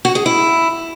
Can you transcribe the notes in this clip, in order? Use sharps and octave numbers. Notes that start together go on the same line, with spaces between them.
F#4
G#4
E4